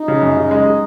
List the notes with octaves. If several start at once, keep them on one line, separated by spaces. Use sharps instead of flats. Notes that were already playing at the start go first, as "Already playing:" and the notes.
Already playing: D#4
C#3
F#2
C#3
G#3
G#3